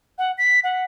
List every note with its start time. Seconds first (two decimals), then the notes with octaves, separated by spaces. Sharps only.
0.18 F#5
0.38 B6
0.64 F#5